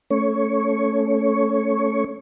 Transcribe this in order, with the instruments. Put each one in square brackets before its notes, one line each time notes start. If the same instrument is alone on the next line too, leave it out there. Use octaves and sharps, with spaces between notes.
[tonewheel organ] A3 C#4 C#5